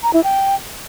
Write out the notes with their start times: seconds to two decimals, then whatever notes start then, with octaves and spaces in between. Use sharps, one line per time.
0.03 A#5
0.13 E4
0.24 G5